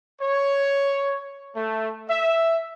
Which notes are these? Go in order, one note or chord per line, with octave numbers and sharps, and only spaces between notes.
C#5
A3
E5